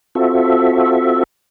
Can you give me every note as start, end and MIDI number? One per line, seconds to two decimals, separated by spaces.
0.15 1.23 60
0.15 1.23 65
0.15 1.23 66
0.15 1.23 69
0.15 1.23 76